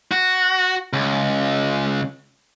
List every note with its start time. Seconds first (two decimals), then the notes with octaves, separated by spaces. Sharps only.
0.11 F#4
0.93 C#2